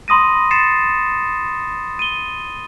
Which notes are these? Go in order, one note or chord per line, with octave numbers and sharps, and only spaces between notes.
B5 C6 D#6 A#6 D#7
C6 A6 C7 C#7 E7
D#7 G7